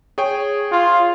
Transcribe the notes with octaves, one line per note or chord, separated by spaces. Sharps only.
G#4 C#5 G5
F4